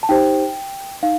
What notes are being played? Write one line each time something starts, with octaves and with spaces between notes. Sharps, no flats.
A5
D#4 G4 C5 G5
D#4 F5